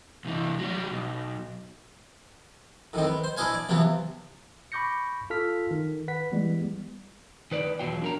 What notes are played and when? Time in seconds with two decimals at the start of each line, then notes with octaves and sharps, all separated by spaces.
0.25 C2 E3
0.59 F#3 G3
0.91 B1
2.93 A2 D#3 C4
3.07 B3
3.24 C5
3.37 D4 E4 B4 D#5 F5 G#5
3.54 D5
3.69 C3 E3 F3 B3
4.72 B5 C#6 D6 G6 A#6 C#7
5.30 F4 A4 F6 B6
5.71 D#3
6.08 B4 F#5 B6
6.32 E3 G3 G#3 B3
7.51 D#3 B4 D5
7.79 E2 B2 F#3 F4 G5
8.02 D4 A#4 A#5